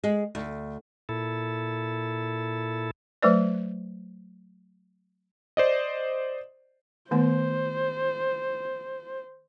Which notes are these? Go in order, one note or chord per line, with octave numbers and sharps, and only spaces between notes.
G#3
D2
A#2 E4 A4
F#3 A3 B4 D5
C5 D5 D#5
D#3 A3 B3 C5